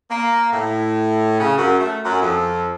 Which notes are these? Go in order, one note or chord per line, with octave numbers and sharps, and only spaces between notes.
A#3
A2
C#3
F#2
A3
F#2
F2